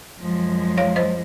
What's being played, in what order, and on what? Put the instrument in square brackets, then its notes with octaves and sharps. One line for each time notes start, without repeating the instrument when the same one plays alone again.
[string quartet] F#2 F3 G#3
[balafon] C#5 F5
C5 D#5